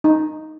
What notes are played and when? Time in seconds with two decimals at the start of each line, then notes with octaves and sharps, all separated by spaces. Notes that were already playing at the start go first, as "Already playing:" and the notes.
0.04 D#4